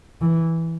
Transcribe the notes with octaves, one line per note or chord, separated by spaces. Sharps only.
E3